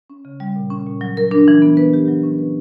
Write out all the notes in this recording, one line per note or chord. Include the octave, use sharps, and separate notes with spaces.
C#4
C#3
G3
A#2
C#4
A#2
F#3
A#4
D4
E3
B3
B4
G4
F#3
C#4
B4